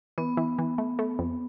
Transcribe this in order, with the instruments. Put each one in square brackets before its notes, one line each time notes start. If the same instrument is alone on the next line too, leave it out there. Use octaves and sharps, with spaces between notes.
[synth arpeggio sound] E3 [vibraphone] B3
[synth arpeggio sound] E3
E3
A3
A3
F2